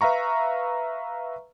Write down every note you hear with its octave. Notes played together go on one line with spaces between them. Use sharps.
B4 E5 F5 A#5 C#6